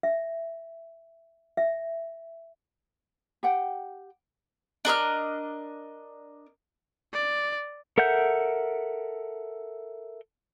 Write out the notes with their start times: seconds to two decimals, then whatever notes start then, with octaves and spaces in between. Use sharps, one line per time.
0.03 E5
1.57 E5
3.43 G4 F#5 G5
4.85 D4 A#4 D#5 F6
7.13 D5
7.98 A4 A#4 E5 F#5 G6